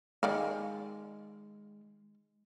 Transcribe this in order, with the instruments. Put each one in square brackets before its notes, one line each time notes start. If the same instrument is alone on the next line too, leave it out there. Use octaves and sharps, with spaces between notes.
[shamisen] D#3 D5 F5 [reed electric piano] G#3